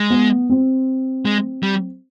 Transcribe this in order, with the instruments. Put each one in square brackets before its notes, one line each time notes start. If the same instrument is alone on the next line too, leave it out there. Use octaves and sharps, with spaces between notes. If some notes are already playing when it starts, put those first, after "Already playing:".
Already playing: [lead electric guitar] G#3
[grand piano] B3
C4
[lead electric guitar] G#3
G3